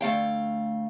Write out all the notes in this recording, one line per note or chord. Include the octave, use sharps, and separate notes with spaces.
D2 A3 F5 G5